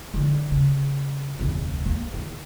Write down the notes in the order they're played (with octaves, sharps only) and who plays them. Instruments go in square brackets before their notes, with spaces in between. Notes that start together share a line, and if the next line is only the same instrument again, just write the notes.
[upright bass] D3 E3
C#3
F1 D2
A#3
D#3